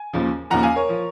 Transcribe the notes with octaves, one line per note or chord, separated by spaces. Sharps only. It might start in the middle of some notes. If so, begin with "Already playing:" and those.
Already playing: G#5
D#2 C#3 F3
D#2 C#3 F3 F#5 A#5
F5 G#5
A#4 C#5
F3